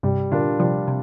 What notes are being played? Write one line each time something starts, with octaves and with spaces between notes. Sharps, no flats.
G2 C3 G3
A#2 D3 D4 F4 A#4
C3 F3 G3
C3